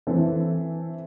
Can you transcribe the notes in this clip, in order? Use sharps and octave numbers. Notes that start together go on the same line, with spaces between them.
E3 C4 A4